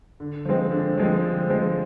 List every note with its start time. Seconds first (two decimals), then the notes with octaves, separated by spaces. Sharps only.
0.20 D3
0.45 F3 G#3 C4
0.72 D3
0.97 F3 G#3 C4
1.24 D3
1.49 F3 G#3 C4